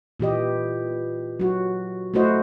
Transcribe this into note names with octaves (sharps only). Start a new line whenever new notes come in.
A#2 E3 G4 D#5
F#3 F#4
A3 E4 F#4 C5 D#5